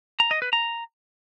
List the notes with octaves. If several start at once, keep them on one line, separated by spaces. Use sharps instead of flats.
A#5
D#5
B4
A#5